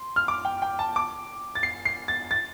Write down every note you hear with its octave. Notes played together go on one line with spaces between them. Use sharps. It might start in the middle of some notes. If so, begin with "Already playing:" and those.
Already playing: C6
F6
D6
G5
G5
A5
D6
A6
C7
C7
A6
A6